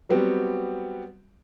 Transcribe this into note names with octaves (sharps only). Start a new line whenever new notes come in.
F#3 G3 B3 C4 F#4 G4